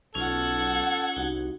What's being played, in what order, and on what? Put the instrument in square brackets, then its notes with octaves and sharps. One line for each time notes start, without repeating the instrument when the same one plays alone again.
[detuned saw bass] B1 [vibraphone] C#4 F4 [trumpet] A4 [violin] F#5 G#6
[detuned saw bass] C2 [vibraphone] D#4 F#4